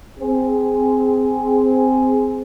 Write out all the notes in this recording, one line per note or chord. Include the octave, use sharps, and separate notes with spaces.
C4 G#4